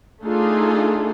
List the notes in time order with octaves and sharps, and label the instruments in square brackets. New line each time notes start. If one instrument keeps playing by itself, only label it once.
[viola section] A3 D4 D#4 F4 G#4 A4